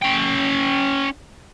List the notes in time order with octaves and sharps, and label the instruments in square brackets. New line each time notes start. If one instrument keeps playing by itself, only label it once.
[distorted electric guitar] C#4 G5